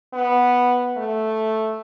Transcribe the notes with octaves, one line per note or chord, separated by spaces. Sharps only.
B3
A3